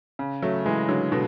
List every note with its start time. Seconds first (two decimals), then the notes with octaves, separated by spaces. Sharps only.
0.19 C#3
0.42 F#3 A3
0.65 E3 G#3
0.89 D3 F#3
1.12 B2 D3